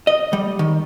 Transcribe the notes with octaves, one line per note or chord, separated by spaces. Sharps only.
D#5
G3
D#3